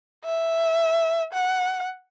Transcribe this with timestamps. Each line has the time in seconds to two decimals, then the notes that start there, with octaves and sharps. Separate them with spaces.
0.25 E5
1.33 F#5